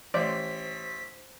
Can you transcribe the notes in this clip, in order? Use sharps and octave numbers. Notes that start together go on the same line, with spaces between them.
A1 C5 D5 B6